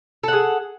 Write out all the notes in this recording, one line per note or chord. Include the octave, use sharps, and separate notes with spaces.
G#4 A4 F#5